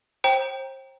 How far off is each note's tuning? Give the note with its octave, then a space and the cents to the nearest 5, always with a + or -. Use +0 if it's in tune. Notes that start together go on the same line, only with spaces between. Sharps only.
C5 +35 G5 +0 A#5 +15